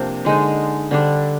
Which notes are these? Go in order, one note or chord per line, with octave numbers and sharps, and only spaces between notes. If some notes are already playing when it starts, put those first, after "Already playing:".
Already playing: C3 F3 A#3 D4
D3 G#3 D#4
D3 G3 D4